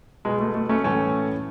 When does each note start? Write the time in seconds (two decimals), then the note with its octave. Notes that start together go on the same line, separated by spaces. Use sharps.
0.25 B2 G#3
0.40 A3
0.55 A3
0.69 A3 C#4
0.84 A2 E3 A3 C#4